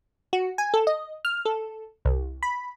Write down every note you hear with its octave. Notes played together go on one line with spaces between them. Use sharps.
F#4
G#5
A4
D#5
F6
A4
C2
B5